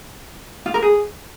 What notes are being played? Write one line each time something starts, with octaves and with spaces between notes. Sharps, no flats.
F4
A#4
G#4